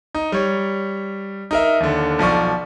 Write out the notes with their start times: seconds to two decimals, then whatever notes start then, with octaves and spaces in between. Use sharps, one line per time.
0.15 D#4
0.32 G3 C#5
1.51 D#4 A#4 E5
1.80 D#2 D3
2.19 B1 F3 D5 C#6